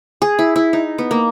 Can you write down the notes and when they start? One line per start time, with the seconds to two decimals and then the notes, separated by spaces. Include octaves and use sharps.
0.22 G#4
0.39 E4
0.56 E4
0.73 D#4
0.98 B3
1.11 A#3